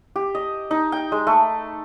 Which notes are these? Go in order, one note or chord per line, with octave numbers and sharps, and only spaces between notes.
G4
D#5
D#4
G5
G#3
A3